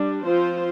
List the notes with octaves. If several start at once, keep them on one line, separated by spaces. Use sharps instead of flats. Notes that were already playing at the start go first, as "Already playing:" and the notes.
Already playing: G3 D4
F3 C4 F4 C5